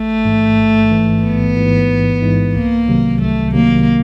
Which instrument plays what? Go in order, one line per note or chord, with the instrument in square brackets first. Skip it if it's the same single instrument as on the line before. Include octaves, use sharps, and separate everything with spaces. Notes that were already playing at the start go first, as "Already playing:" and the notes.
Already playing: [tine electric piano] A1 [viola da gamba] A3
[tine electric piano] G#2 E3
A1
G#2 E3
[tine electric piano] A1 [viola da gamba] B3
[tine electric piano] G#2 E3
A1
G#2 E3
[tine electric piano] C2 [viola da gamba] A#3
[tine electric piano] C3 D#3 F#3
[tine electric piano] C2 [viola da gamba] A3
[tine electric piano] C3 D#3 F#3 [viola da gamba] A#3